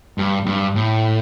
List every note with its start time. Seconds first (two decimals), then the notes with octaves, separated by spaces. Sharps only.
0.18 G2
0.46 G2
0.75 A2